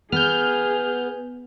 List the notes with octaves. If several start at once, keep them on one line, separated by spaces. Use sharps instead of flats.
B3 G#4 F6 G6